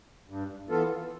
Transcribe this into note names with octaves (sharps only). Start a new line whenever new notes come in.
G2
E3 B3 F4 A4